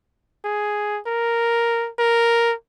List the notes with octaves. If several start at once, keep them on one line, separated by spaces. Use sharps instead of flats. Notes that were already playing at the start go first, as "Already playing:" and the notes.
G#4
A#4
A#4